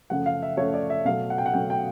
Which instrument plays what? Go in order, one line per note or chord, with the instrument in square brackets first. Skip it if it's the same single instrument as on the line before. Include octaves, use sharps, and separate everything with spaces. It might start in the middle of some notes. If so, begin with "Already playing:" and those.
[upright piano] F#2 C#3 F3 A3 F#5
F5
E5
F#2 C#3 F3 A3 C#5
D5
E5
B2 F#3 A3 F5
F#5
G5
F#5
B2 F#3 A3 G5
G5